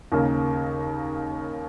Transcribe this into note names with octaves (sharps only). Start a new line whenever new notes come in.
D#2 C#3 A#3